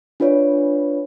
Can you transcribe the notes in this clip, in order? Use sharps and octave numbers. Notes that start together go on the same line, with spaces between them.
D4 F4 B4 C#5 D5